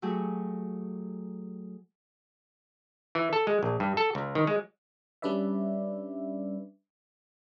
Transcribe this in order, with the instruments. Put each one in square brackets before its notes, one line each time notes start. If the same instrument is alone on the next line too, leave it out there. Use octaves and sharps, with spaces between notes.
[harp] F#3 A3 G4 G#4
[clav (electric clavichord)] E3
A4
G#3
A#1
G2
A4
C#2
D#3
G#3
[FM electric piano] G3 C#4 D4 B4 D5 E5